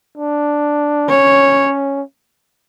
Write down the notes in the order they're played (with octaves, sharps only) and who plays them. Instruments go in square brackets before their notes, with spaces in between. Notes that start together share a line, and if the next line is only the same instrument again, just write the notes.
[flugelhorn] D4
[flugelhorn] C#4 [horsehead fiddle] C#5